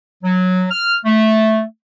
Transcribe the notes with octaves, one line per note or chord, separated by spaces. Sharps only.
F#3
F6
A3